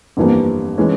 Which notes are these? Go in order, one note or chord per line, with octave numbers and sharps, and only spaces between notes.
G1 F2 E3 G3 A#3
E3 G#3 C#4